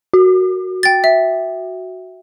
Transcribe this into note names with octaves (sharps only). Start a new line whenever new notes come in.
F#4
G5 A6
E5